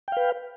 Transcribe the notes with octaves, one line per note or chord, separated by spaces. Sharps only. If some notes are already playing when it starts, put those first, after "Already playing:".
B4 F5 G5